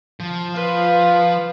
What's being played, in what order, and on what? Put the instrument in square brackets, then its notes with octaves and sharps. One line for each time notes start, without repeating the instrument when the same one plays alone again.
[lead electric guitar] F3
[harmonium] F4 [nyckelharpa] B4 [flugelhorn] F5